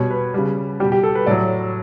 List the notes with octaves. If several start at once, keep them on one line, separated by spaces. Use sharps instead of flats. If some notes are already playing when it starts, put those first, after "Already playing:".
Already playing: B2 G3 C#5
B4
C#3 G3
B2 G3 G4
G4
A4
B4
A2 F#3 D5